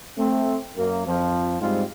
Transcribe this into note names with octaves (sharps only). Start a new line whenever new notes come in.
A3 C4
F#2 A#3
F2 F3
G#2 G3 G#3 C4 F4